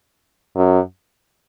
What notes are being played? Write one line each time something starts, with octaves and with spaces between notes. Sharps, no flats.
F#2